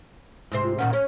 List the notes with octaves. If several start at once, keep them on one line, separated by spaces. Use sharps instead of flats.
G#2 C3 C5
F4
A#2 D#3 C#4 F#5
C#4 C#5